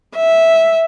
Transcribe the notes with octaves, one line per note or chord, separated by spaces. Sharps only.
E5